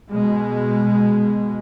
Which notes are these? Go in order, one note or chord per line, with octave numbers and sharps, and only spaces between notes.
B2 G#3